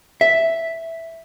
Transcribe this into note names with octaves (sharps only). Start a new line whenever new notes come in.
E5